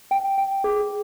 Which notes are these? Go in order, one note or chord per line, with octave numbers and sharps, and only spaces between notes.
G5
G5
G#4